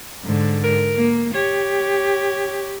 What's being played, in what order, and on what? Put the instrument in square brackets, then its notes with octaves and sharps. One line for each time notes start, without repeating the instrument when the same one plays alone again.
[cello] G#2 D3
[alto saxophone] A#4
[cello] A#3
[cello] G4 [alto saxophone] C#5